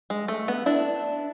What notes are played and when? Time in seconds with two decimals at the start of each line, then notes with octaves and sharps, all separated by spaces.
0.10 G#3
0.28 A3
0.48 B3
0.66 D4 E4